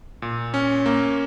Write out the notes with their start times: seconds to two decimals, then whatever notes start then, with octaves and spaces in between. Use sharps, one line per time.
0.22 A#2
0.54 C#4
0.86 A#3